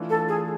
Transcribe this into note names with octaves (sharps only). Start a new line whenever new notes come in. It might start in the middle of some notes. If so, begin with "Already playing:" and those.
Already playing: E3 A3 D4 F4
A4
G#4